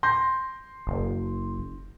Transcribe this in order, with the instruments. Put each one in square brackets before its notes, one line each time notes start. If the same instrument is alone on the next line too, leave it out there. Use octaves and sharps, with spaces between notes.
[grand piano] C6 G6 A#6
[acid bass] F#1